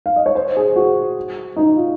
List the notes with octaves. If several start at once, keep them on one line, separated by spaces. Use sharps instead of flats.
F5
D#5
C#5
C5
G#4
F#4
D#4
F4